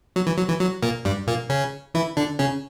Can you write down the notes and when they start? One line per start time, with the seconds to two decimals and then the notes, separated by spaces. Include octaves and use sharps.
0.16 F#3
0.27 E3
0.38 F#3
0.49 E3
0.60 F#3
0.82 A#2 A#3
1.05 G2 G3
1.27 A#2 A#3
1.49 C#3 C#4
1.94 E3 E4
2.17 D3 D4
2.39 C#3 C#4